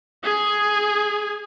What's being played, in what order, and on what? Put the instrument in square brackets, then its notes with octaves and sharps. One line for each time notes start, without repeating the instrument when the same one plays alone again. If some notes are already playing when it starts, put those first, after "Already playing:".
[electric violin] G#4 G#5